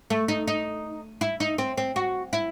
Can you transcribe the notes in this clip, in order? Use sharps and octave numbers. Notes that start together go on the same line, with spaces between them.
A3
D#4
D#4
E4
D#4
C4
C4
F#4
E4